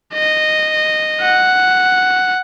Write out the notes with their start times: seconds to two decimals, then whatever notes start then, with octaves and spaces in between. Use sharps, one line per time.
0.14 D#5
1.21 F#5